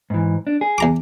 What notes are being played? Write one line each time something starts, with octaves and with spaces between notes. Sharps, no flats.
G#2 E3
D4
G#4
E2 A#5 D6